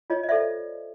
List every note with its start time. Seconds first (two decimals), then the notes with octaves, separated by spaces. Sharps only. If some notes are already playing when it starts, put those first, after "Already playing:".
0.10 F4 C#5 D#5
0.23 D#5
0.29 A4 C5 D5 E5